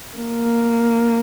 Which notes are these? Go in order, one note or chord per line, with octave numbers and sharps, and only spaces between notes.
A#3